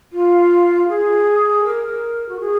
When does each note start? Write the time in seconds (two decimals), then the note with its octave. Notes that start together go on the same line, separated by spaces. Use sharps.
0.12 F4
0.88 G#4
1.64 A#4
2.28 F#4
2.40 G#4